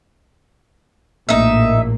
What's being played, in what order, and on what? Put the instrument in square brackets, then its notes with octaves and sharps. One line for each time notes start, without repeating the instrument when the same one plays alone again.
[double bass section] A#1 A2 A#3 [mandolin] D#4 E5